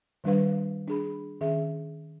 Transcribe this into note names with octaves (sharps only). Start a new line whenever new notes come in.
D#3 G3 D4 B4 F5
D4 G#4 B5
D#3 C#4 G#4 E5